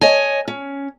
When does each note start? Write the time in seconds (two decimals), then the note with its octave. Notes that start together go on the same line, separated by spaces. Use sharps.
0.01 C#5 D#5 G#5
0.48 C#4